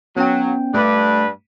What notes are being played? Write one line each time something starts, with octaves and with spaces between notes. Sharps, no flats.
F#3 B3 C#4 G5
G2 A3 D4 B4